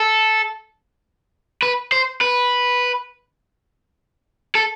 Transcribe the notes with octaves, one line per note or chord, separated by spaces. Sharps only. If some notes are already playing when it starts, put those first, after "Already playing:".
Already playing: A4
B4
C5
B4
A4